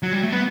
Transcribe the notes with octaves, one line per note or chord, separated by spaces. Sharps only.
F#3
G3
A3
B3